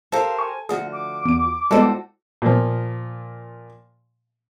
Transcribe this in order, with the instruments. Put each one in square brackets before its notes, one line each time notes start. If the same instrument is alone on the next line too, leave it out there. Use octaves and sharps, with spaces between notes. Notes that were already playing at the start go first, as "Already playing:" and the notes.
[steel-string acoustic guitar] G4 A#4 C5 [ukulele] A4 [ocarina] F5
[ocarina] G#5 [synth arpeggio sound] C#6
[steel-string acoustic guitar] D2 F3 F#4 [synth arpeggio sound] G#4 [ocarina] F#5
[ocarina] D6
[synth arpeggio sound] E2 D7
[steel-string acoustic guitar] A2 F#4 [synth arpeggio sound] G3 G#3 B3 [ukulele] A4 C5 D5
[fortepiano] A#2 F3